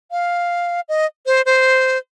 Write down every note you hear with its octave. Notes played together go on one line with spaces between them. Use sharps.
F5
D#5
C5
C5